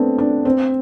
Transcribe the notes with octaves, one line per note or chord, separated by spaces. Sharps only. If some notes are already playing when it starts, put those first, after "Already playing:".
Already playing: A3 B3 C4 D4
D4
C4